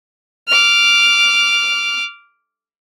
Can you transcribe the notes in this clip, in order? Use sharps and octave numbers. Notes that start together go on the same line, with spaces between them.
D6 F6